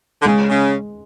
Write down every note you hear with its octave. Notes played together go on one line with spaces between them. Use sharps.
D3
C#3 G#3
C#3